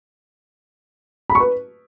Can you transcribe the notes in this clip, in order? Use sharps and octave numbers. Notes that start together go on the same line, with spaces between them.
B5
C#6
B4